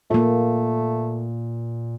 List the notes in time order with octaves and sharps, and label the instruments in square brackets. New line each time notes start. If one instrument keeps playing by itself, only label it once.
[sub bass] A#2 [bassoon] A3 [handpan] A#3 F4